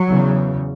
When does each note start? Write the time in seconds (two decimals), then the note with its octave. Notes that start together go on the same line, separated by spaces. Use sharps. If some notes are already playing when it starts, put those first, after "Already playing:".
Already playing: F#3
0.09 E2 C#3